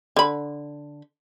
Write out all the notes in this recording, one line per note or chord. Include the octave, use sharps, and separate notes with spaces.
D3 B5